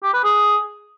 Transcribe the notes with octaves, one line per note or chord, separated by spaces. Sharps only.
G4
B4
G#4